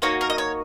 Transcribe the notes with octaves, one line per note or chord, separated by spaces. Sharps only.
A#3 D#4 F#4 C#5
A#4
D#5
C#5